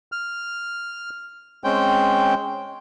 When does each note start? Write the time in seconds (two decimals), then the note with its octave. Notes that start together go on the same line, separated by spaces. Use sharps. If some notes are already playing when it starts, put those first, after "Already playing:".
0.12 F6
1.64 G#3 C4 C#4 G5